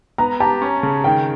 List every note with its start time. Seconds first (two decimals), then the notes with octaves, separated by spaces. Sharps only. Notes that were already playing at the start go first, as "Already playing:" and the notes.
0.18 B3 A#5
0.40 G4 A5
0.62 C#4
0.83 C#3
1.04 D#3 G5